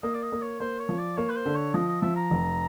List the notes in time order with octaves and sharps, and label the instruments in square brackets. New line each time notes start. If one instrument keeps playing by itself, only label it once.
[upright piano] A#3 [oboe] D#5
[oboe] D5
D#5
[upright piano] A#3
[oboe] C#5
[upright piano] A#3 [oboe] C5
[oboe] C#5
[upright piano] F3
[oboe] D5
[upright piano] A#3 [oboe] C#5
[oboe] B4
C5
[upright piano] D3
[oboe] C#5
[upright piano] F3 [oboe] D#5
[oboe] D#5
[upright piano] F3 [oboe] E5
[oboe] A#5
[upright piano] F1